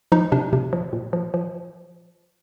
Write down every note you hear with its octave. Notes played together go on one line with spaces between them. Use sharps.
F3 D#4
C3 D4
C3
F3
A#2
F3
F3